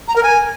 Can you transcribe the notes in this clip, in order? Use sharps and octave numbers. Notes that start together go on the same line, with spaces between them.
A#5
A#4
G#5